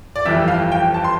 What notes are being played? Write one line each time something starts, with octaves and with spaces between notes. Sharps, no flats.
D5
G1 F2 E3 G3 E5
F5
G5
A5
C6